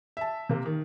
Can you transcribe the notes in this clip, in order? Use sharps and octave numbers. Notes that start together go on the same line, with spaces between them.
E5 A5
C3 A#3
D#3